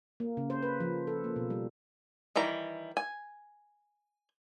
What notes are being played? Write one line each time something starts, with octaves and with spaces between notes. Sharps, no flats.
A#3
C#3
C5
B4
F3
A4
A#3
B2
G3
D#3 E3 G3 A#5
G#5